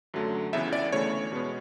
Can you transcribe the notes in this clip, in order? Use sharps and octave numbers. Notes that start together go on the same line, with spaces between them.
F#2 D3 F#3 A3
C#2 C#3 E3 B3 E5
D5
D2 C#3 E3 A3 C#5
B2 G#3 B3